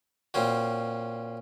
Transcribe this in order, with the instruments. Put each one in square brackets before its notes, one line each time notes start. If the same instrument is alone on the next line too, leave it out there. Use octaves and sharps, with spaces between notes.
[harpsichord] A#2 C4 C#4 F#4